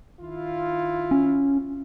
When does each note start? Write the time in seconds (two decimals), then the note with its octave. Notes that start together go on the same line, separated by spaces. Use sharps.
0.20 D#3 E4 F4
1.11 C#4